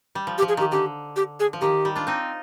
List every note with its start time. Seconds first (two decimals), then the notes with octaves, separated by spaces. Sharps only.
0.15 G3
0.27 F3
0.38 G4
0.42 F3
0.49 G#4
0.57 D#3 G4
0.72 D3 G4
1.16 G4
1.40 G#4
1.53 F3
1.61 D#3 G4
1.85 G3
1.96 D4 F4
2.07 C4 D#4